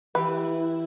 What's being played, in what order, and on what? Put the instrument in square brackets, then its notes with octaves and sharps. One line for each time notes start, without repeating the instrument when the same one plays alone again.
[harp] E3 G4 [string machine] E4 [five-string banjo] B4